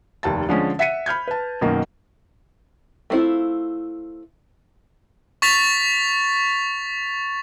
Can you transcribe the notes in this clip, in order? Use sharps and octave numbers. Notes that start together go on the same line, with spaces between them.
F1 D#2 A5 A6
D3 F3 G#3 C#4
E5 F#5 B6 C#7 D#7
B5 F6 G6 G#6
B4 A5
F#2 B2 D#3 F#3 A#3
A3 B3 C4 E4 F4
C#6 A6 B6 F7